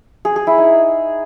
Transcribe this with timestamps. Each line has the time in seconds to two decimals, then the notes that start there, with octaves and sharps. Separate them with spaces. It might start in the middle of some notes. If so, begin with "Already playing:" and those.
0.25 G#4
0.36 G#4
0.47 E4
0.58 D#4